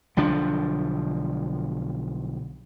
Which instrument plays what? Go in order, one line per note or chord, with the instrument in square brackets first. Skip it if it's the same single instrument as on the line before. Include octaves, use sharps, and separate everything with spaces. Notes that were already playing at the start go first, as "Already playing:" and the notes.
[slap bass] B1 D3 F3 D4